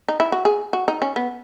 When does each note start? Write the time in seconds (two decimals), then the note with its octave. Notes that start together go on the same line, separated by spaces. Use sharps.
0.08 D#4
0.20 E4
0.32 F#4
0.45 G#4
0.73 F#4
0.88 D#4
1.02 C#4
1.16 B3